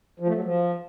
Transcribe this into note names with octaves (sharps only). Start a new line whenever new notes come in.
F3
A3
F#3
F3